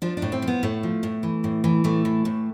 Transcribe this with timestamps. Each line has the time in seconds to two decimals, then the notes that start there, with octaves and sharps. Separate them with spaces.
0.02 F3 D4
0.17 D4
0.22 A2
0.32 C4
0.42 F3
0.48 B3
0.63 A2 A3
0.83 F3
1.03 A2
1.23 E3
1.44 A2
1.64 E3
1.84 A2 A3
2.05 E3
2.25 A2